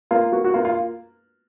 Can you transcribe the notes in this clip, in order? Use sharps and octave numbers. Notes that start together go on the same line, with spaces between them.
A#3 F4
A#3 F#4
F#4
A#3 F4
F4